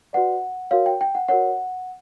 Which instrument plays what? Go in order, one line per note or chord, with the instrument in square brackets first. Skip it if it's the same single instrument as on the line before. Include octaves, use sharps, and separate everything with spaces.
[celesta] F#4 B4 D5 F#5
F#4 A#4 C#5 F5
G5
G5
F#5
F#4 A#4 C#5 F#5